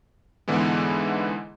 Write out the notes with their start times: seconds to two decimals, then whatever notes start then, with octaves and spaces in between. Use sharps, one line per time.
0.48 G#2 D3 E3 G#3 B3